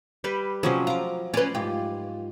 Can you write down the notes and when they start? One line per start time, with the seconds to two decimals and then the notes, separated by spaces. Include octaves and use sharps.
0.24 G3 G4 B4
0.63 C3 F3 F#3 C#4 G#4
0.87 F4 A#5 D6
1.34 C#4 B4 D5 C6
1.55 G#2 F4 G4